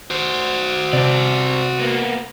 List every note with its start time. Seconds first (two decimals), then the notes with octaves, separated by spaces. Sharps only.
0.11 F#4 C5
0.93 C3 C4 D5
1.79 A#3 B3